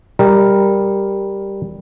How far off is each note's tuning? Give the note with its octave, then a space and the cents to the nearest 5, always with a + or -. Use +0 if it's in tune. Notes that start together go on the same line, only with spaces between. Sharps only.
G3 +5 A#4 +0 D#5 +45